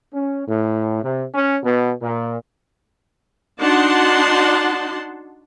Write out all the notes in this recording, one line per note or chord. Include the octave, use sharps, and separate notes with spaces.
C#4
A2
C3
C#4
B2
A#2
D4 D#4 F#4 F#5 A5 C6